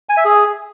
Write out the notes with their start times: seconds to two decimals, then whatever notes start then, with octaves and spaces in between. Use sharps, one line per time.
0.09 G#5
0.17 E5
0.25 G#4